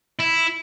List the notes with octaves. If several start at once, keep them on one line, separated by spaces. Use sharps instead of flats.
E4